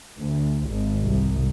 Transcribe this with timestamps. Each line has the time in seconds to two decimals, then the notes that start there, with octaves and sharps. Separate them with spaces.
0.20 D2
0.70 G#1
1.04 C2